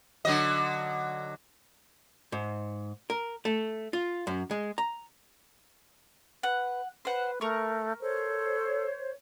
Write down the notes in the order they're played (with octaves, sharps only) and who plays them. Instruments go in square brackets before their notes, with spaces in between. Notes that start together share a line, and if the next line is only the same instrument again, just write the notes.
[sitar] D3 F#3 D#5
[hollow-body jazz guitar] G#2
A#4
A3
F4
F#2
G#3
A#5
[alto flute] B4 [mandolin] F#5
[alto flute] B4 [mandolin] C5 F#5
[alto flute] A3 [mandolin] A#4 C#6
[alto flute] A4 [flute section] C5 C#5